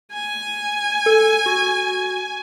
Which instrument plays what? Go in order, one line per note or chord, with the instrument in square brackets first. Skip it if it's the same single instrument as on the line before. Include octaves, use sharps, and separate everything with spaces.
[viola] G#5
[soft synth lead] A4
F#4